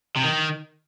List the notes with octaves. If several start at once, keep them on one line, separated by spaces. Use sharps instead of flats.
C3
D#3